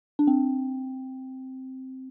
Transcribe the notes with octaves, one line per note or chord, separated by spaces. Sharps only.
D4
C4